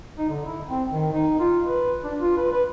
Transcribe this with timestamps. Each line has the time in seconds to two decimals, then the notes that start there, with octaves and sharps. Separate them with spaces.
0.18 D#4
0.30 D3
0.45 E4
0.69 C4
0.90 D#3
1.13 D#4
1.40 F4
1.65 B4
2.04 D4
2.19 F4
2.37 B4
2.52 B4